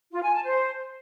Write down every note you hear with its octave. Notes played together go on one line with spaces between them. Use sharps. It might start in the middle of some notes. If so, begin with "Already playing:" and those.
F4
G#5
A5
C5